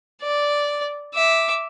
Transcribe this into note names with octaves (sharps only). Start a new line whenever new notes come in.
D5
E5 D6